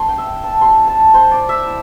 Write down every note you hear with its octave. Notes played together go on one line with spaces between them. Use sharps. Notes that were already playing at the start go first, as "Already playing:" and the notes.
Already playing: A3 D4 A5 C6
G5
E5
G5
A5
G3 C4 E4 C6
A5
C5
D5
E5
E4